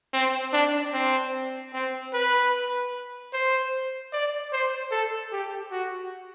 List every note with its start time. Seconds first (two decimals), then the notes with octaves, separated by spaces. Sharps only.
0.13 C4
0.53 D4
0.93 C4
1.73 C4
2.13 B4
3.33 C5
4.13 D5
4.53 C5
4.91 A4
5.32 G4
5.71 F#4